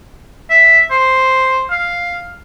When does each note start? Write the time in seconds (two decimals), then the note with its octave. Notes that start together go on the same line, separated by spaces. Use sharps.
0.50 E5
0.91 C5
1.70 F5